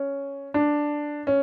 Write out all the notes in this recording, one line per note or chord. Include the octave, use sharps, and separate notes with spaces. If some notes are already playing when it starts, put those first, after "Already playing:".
Already playing: C#4
D4
C#4